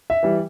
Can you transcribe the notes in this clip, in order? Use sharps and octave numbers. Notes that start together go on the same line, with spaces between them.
E5
E3 G3